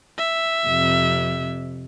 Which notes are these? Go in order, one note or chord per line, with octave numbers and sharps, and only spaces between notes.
E5
F2 C3